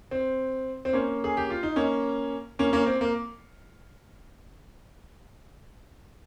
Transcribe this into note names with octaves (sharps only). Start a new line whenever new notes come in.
C4
C4
A#3 C#4
G#4
G4
F4
D#4
A#3 C#4
A#3 C#4
A#3 C#4
C4
A#3